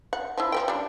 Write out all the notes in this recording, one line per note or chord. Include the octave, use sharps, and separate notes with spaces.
F#5
F3 E4
F3 B4 G5
G3 D4